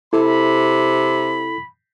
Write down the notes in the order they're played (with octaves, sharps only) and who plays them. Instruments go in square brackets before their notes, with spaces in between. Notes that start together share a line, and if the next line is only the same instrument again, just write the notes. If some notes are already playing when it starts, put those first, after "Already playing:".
[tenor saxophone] C3 [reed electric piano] E4 A4 [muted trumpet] B5